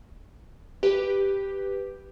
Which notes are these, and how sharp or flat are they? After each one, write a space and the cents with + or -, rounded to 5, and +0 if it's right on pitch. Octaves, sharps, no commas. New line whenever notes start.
G4 +0 B4 +0